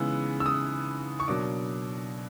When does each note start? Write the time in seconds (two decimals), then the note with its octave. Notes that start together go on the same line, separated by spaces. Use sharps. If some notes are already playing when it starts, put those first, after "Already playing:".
Already playing: C#3 E3 G#3 B3 D#4 E6
0.40 E6
0.46 D#6
1.20 C#6
1.28 B2 F#3 A#3 D4 D6